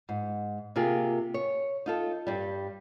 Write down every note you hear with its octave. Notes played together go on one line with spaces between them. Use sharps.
G#2
C3 A#3 F4 G#4
C#5
D#4 F4 A4
G2 G3